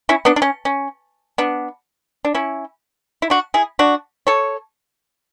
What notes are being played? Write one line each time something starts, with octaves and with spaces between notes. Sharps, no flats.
C#4 E4
B3 D4
D4
C#4
C#4
B3 D4
D4
C#4 E4
E4
D4 F#4
E4 G#4
D4 F#4
A4 C#5